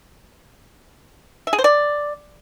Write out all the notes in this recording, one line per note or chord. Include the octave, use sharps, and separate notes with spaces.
E5
G#4
C5
D5